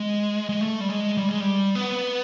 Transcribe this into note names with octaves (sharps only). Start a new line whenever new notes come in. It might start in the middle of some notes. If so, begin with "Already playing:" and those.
Already playing: G#3
G#3
A3
G3
G#3
G3
G#3
G3
B3